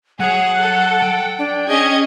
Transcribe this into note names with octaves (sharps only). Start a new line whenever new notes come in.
F#3 G#4 C#5 F#5
A4
G5
D4
C#4 G#4 D#5 G#6